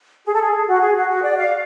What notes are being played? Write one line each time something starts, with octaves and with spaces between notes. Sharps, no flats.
G#4
A4
G#4
F#4
G#4
F#4
F#4
D5
F5